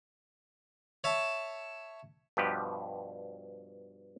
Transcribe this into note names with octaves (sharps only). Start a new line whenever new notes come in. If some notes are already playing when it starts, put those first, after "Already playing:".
C#5 E5 A5
G2 B2 F3 G4 B4